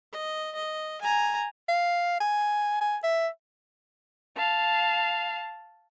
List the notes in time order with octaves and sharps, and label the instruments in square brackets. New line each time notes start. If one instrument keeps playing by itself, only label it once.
[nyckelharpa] D#5
D#5
G#5 A#5
[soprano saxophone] F5
G#5
G#5
E5
[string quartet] F5 A5